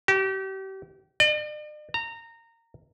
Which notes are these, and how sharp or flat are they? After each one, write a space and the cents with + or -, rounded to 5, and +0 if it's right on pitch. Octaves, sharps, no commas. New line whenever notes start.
G4 -35
D5 +45
A#5 -20